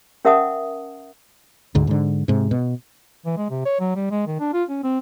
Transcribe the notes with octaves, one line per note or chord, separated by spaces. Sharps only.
C#4 A#4 E5 F#5 A5 D#6
D2 G#2 D3
G#2 D3
G#2 C3
B2
E3
G#3
C3
C#5
F#3
G3
G#3
D#3
D4
F4
C#4
C4